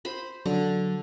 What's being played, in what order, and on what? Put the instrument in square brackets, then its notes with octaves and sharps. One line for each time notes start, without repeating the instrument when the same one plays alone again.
[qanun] C5 B5
[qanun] D3 [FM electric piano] F#3